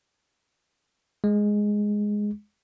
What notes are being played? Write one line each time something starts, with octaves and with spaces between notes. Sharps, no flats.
G#3